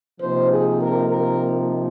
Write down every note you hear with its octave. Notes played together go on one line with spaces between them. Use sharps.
C3 F3 A#3 D#4 C5
G#4
A#4
A#4